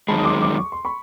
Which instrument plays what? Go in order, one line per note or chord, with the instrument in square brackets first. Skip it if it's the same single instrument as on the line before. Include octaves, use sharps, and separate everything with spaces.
[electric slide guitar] F#2 D#3 G#3 [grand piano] A5 B5
[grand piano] D#6
C6 D6
C6 D6
C#6
C6
B5 C#6